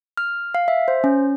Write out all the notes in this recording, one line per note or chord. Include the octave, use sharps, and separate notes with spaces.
F6
F5
E5
C5
C#4